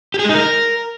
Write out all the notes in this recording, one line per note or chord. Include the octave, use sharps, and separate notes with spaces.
G4
G#4
G#3
D#4
A#4